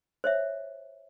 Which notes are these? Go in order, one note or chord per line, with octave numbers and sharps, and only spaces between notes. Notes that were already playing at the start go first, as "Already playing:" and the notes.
C5 C#5 E5